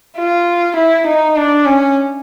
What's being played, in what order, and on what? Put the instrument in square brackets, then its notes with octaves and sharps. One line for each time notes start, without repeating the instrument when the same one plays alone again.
[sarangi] F4
E4
D#4
D4
C#4